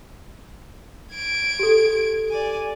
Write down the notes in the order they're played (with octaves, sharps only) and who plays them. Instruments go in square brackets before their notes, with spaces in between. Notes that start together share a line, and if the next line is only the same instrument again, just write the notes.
[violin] G#6 D7
[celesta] G4 A4
[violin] D5 G#5